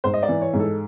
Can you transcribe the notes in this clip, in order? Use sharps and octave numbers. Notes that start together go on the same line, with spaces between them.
G#2 C5
D#5
D5
E3
C#5
G#2
A4